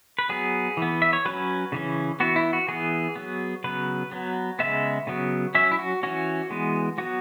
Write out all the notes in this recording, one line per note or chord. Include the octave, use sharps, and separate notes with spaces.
B4
F#3 B3 G#4
E3 B3
E5
C#5
F#3 C#4 B4
C#3 E3 C#4
E3 B3 F#4
E4
F#4
E3 B3 G#4
F#3 B3
C#3 F#3 B3 B4
F#3 B3
C#3 G#3 B3 E5
C#3 F#3 B3
F#3 C#4 E5
E4
F#4
E3 C#4 F#4
E3 G#3 B3
F#3 B3 F#4